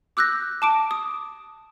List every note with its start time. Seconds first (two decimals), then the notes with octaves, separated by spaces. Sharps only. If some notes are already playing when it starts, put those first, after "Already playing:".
0.17 D6 E6 F#6 G6 A#6
0.62 A5 D6 D7
0.91 D#6